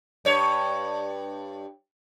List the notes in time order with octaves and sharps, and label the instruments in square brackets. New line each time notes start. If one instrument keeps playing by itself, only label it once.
[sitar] G2 C#5